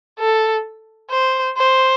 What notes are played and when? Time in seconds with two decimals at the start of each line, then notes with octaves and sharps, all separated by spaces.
0.19 A4
1.11 C5
1.57 C5